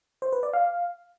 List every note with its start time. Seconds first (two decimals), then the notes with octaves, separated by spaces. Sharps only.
0.22 C5
0.33 B4
0.43 D5
0.53 F5